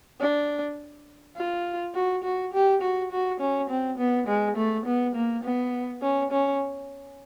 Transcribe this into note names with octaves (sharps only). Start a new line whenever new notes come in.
D4
F4
F#4
F#4
G4
F#4
F#4
C#4
C4
B3
G#3
A3
B3
A#3
B3
C#4
C#4